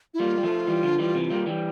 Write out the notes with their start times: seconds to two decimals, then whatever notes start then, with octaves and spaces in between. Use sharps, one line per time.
0.14 E4
0.19 G3 A#3 F4
0.38 G3
0.43 F3 A3
0.67 E3 G3
0.83 D3 F3
0.99 E3 G3
1.15 C3 E3
1.31 G3 A#3
1.46 E3 G3